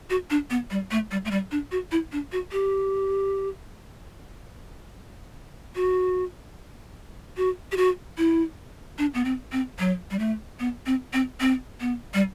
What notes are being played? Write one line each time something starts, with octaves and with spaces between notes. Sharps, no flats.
F#4
D4
B3
G3
A3
G3
A3
G3
D4
F#4
E4
D4
F#4
G4
F#4
F#4
G4
F#4
E4
D4
B3
C4
C4
F#3
G3
A3
B3
C4
C4
C4
B3
G3